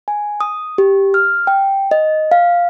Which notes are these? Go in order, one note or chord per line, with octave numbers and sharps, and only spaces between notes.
G#5
D#6
G4
F6
G5
D#5
F5